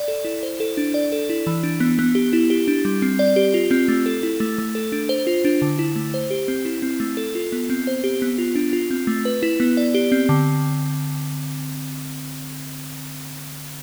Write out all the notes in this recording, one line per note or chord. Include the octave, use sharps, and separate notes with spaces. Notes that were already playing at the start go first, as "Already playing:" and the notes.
Already playing: D5
A4
E4
C5
A4
D4
D5
A4
E4
E3
D4
B3
B3
G4
E4
G4
D4
G3
C4
D5
G4
F4
C4
A3
A4
E4
A3
A3
A4
D4
C5
F4
D4
D3
E4
A3
C5
G4
C4
E4
C4
A3
A4
F4
B3
C4
C5
G4
B3
F4
D4
F4
C4
A3
B4
E4
B3
D5
G4
C4
D3